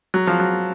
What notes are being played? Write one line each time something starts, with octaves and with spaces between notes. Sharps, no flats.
F#3
F3
F#3